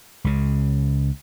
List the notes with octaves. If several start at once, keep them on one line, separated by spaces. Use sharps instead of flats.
C#2 C#3